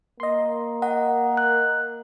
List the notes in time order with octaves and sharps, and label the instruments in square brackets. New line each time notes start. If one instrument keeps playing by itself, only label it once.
[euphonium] A#3 [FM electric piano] D#5 C6
[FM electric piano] D#5 [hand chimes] F#5
[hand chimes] F#6